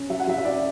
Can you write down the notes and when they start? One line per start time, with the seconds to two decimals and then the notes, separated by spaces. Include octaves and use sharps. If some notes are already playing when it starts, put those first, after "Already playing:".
Already playing: C#4
0.10 F#3 E5
0.20 F#5
0.27 F#3 E5
0.38 E5
0.45 C#4 D5